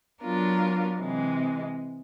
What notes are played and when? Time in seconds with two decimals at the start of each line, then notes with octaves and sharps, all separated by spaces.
0.23 F#3 B3 D4 F4 A#4
0.98 C3 E3 G#3